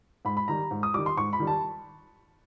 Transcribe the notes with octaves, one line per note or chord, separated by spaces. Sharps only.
G#2 B5
B5
D#3 G3 A#5
G#2
D#6
D#3 G3 D6
C6
G#2 C#6
B5
D#3 G3
A5